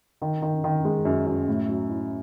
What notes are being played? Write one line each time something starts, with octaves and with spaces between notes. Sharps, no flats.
D#3
D#3
D#3
G#3
F#2
F#2
A2
F#3
E4